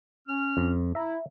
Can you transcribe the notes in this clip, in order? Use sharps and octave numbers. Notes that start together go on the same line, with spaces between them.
C#4 F6
F2
E4 E5 A#5